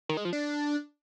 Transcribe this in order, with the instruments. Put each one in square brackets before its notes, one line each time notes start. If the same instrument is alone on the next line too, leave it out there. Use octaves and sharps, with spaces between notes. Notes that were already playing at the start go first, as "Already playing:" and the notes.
[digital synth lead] D#3
G#3
F3
D4